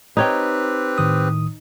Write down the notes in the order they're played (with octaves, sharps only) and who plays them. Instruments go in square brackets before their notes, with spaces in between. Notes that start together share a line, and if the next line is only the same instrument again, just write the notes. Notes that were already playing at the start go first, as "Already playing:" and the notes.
[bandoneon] C4 G4 B4 [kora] D#4 C#5 G5
[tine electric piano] A2 D#3 D#6